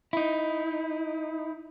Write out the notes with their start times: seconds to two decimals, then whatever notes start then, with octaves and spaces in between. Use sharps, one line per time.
0.13 D#4 E4